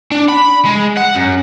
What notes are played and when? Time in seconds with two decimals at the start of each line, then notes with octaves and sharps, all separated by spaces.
0.11 D4
0.28 B5
0.65 G#3
0.97 F#5
1.14 F#2